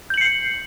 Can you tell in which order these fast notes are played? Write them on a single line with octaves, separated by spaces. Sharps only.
G6 F#7 C#7 C7